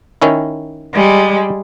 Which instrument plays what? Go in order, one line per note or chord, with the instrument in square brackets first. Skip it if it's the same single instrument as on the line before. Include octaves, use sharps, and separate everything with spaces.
[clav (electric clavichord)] D#3 C#4 E4
[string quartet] G3 G#3